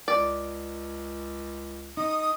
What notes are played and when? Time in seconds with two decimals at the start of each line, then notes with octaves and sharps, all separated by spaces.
0.08 C#2 D5
1.97 D#4 D#6